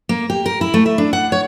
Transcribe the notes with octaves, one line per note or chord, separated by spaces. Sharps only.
A#3
G4
A#4
E4
A3
E5
D4
F#5
C#5